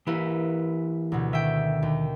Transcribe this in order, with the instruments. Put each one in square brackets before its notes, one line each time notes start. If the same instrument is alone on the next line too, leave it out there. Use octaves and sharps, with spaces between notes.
[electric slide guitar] E3 G4 [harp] A#3 E4 B4
[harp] D2 B2
[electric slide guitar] D#3 [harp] E5 G5
[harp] D#2